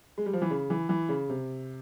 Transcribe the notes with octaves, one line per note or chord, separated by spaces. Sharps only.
G#3
G3
F3
E3
C#3
E3
E3
C#3
C3